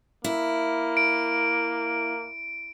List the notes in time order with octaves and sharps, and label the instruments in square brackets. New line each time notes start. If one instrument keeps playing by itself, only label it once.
[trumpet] A#3 [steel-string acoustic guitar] E4
[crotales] D7